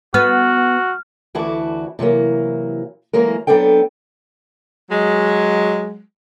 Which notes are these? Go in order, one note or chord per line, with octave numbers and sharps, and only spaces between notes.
B3 F#4 F6
D2 E3 E4 F#4 D5 A5
C3 E3 F#3 A#3
E3 F#3 G#3 A#3 A#4
F#3 B3 C4 D4 A4 G5
F#3 G#3